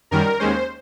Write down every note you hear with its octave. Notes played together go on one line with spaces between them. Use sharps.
F#2 D#3 G3 A#4
D#2 D#3 G#3 C#4 C5